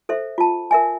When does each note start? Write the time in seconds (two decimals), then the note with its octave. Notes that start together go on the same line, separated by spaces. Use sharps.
0.09 A4 C5 E5
0.38 F4 A5
0.71 A#4 E5 G#5